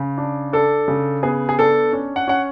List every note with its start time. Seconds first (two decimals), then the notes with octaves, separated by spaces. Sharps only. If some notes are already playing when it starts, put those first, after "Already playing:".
Already playing: C#3
0.18 D4
0.53 D4 A4
0.88 C#3
1.23 B3 G#4
1.49 G#4
1.59 D4 A4
1.93 C#4
2.16 F#5
2.27 C#4 F#5